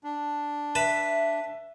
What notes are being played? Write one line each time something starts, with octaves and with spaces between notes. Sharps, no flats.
D4
B4 E5 A5 B5